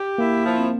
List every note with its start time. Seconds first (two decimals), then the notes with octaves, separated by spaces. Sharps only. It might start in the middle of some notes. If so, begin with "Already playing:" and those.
Already playing: G4
0.18 A#3 E4
0.45 F3
0.58 C4